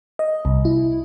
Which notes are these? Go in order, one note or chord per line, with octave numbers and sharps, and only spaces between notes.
D#5
C2
E4